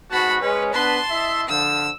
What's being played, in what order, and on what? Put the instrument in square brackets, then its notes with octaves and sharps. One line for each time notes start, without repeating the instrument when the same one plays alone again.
[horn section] G#2 B3 F#4 [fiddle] A5 B5
[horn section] G#3 C#4 [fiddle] B4
[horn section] B3 D4 B4 [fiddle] A5 C6
[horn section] E4 D#5 E5
[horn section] D3 F3 [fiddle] E6